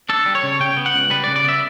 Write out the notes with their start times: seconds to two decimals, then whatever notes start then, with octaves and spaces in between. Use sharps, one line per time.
0.09 D4 A4
0.26 G3
0.35 C#5
0.43 C#3
0.60 C#3 G5
0.77 B3
0.86 F#5
0.94 C#2
1.10 G3 B4
1.24 D5
1.28 C#3
1.36 D5
1.44 B3 E5